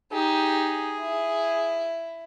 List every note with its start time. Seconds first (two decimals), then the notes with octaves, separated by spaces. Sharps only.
0.12 D#4 G4 G#4
1.00 E4